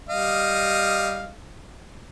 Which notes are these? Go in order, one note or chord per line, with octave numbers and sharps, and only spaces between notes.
G3 D#5 F5